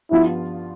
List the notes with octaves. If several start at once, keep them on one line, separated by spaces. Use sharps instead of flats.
G2 F3 B3 E4 F4